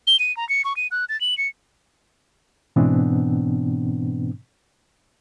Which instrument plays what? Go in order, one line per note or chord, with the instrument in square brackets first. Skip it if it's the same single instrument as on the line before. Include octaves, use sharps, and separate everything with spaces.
[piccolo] G7
D#7
A#5
C#7
C#6
D#7
F#6
A6
F#7
C#7
[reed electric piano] G#2 B2 E3 B3 C4 D4